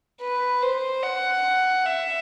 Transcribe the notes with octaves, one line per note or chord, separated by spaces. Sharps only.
B4
C5
F#5
E5